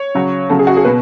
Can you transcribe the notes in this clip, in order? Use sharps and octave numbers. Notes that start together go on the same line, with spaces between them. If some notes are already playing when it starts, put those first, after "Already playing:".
Already playing: C#5
C#3 F#3
C#3 F#3 A4
G#4
F#4
G#4
B2 B4